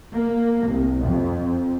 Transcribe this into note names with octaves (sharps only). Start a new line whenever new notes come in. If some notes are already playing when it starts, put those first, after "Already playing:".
A#3
C2
F2